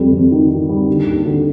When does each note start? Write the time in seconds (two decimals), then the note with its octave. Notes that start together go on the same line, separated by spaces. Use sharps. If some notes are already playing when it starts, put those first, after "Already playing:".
Already playing: F2 G3
0.12 F2
0.31 D#3
0.50 D#3
0.69 G3
0.88 D3
1.06 D#2
1.26 D3